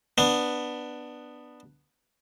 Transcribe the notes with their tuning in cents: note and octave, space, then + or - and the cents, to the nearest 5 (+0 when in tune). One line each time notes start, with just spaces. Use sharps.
B3 +0 D4 +10